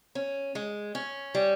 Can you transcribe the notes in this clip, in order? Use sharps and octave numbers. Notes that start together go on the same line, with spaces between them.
C#4
G#3
C#4
G3